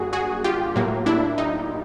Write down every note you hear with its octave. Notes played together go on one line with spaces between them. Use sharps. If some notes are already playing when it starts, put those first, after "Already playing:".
Already playing: F#2 D3 G3 A#3 F#4 G#4
F#4 G#4
F4 G4
A2 F#3 A#3
D4 E4
D#4